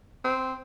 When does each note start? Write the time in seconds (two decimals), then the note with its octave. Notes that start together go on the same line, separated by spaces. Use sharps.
0.24 C4